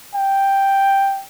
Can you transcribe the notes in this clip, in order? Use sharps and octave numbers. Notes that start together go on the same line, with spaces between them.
G5